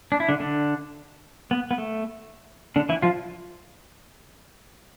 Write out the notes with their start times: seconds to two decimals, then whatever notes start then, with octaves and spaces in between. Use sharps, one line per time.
0.12 D4
0.20 E4
0.29 D3 D4
0.40 D3 D4
1.51 B3
1.71 B3
1.78 A3
2.76 D3 D4
2.89 E3 E4
3.02 F3 F4